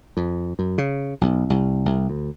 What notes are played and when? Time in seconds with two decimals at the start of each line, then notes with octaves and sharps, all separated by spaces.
0.17 F2
0.59 F#2
0.78 C#3
1.21 B1
1.50 C2
1.86 C2
2.09 D2